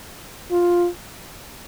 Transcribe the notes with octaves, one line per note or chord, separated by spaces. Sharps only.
F4